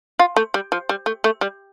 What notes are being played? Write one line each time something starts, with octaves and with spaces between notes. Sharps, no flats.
F4
A3
G3
F3
G3
A3
A3
G3